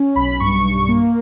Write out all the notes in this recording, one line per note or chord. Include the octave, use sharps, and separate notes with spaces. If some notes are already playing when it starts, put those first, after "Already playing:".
Already playing: C#4
B1 B5
G2 C#6
G2
A#3